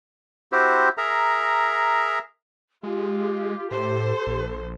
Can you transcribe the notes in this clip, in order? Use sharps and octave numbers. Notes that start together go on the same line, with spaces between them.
C4 E4 F#4 G4 C5
G#4 A#4 E5 A#5
G#3 F4 G4
A2 A4 C5
A#1